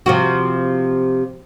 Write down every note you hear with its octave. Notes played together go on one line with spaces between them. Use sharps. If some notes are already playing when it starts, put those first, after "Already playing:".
C3 F3 F#4